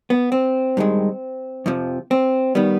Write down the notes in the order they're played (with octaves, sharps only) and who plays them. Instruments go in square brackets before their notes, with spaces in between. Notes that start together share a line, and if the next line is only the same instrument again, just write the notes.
[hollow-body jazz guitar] B3
C4
G2 D#3 G#3
F2 C3 F3
C4
D#3 G3 B3